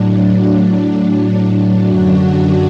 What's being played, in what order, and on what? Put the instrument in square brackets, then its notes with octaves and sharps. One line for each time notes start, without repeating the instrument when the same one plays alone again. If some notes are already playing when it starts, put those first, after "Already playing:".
Already playing: [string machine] A2 F#3 D4
D4
D4
F#2 D3 F#3 D4 F#4